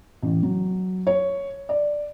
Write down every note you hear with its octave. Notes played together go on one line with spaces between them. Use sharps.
A1
F#3
C#5
D5